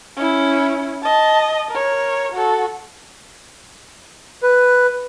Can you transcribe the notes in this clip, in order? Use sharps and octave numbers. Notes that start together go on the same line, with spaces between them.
C#4 E4
D#5 A5
A#4 C#5
F#4 A4
B4